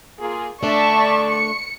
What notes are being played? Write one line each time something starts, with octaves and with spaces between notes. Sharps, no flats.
A#3 F4 G#4
D3 A3 D4 D5 E5 A5 C#6
C#7